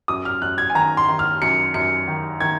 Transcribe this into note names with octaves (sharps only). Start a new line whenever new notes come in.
F#2 D#6
F6
F#2 F#6
G#6
G#5
D#3 A#5
C6
D#3
F6
F#2 C#7
F#2 C#7
D#3
D#3 G#6